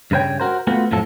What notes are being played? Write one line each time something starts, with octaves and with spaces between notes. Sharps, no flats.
G2 C#3 B4 C#5 G5
F#4 A#4 C5
A3 B3 C4 F4 F#4
F2 A2 F3 F#3 A4